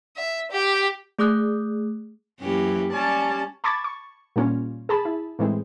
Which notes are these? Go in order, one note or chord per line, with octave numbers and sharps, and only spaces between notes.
E5
G4
A3 G#4 D6 D#6 F#6 G6
F#2 E3 A#3 C#4 G4
G3 C#4 D5 A5
A5 B5 C#6 D6 G#6 A6
C#6
A#2 G3 A#3 C#4 F4
G#4 A5 B5
E4
A2 E3 G#3 C4